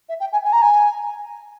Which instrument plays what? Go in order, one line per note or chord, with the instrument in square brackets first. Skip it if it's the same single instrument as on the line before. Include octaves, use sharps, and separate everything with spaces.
[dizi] E5
G5
G#5
G#5
A#5
G#5